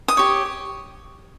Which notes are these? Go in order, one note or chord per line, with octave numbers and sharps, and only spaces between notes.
D#6
G4 C#5